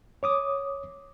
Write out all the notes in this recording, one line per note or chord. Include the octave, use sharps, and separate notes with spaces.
C#5 D6 D#6